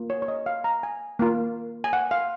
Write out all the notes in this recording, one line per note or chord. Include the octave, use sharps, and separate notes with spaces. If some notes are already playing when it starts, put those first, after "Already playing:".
Already playing: A#3 F4
C#5
C#5
D#5
F5
A#5
G#5
A#3 F4
G#5
F#5
F5